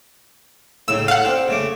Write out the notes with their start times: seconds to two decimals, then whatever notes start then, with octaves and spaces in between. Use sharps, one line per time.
0.88 A2 C#3 D#4 E6
1.08 A4 F5 F#5
1.25 C4 D4 G4
1.48 C#3 A3 D6